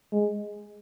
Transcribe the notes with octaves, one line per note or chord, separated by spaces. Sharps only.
G#3